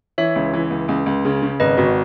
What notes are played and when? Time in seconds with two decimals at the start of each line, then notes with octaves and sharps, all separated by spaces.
0.18 E3 C#5 E5
0.36 C#2
0.53 E3
0.70 C#2
0.88 C#2
1.06 C#2
1.25 C#3
1.42 C#3
1.60 G#1 B4 D#5
1.78 G#1 F#4